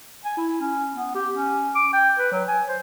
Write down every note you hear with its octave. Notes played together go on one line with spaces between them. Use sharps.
G#5
E4
C#4
B3
G4
C#4
D6
G5
B4
F#3
G#5
C5